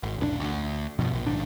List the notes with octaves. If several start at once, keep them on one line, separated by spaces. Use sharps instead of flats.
G#1
E1 A#1 C#4 D4
D2
G2 B2 F3
A#1
A#1 G#2 D#3 D4